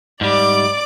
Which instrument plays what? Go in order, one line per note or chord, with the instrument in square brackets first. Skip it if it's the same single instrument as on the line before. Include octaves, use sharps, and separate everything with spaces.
[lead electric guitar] G#2 G3 [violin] D5 D6